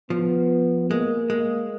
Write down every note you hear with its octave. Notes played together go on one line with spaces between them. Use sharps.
F3 B3
G#3 A#3
G#3